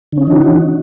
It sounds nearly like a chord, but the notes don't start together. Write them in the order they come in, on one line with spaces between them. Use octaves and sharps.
D3 C#4 D#4 E3 F#4